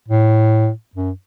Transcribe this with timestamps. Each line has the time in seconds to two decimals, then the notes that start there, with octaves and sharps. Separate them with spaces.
0.09 A2
0.96 F#2